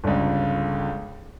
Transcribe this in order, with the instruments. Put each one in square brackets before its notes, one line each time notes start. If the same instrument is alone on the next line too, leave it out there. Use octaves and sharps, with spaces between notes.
[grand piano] G1 C#2